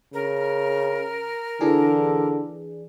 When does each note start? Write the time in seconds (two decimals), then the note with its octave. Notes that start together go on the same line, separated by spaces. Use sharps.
0.14 C#3 A#4
1.61 D3 E3 D4 G#4